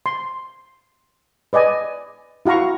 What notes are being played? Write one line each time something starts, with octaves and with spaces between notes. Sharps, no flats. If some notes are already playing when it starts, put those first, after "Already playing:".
C6
B4 D5 D#5 G#5
E4 F#4 F5 A#5 C#6